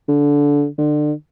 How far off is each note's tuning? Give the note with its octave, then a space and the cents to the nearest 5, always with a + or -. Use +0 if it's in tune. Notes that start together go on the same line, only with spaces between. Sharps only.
D3 -20
D3 +30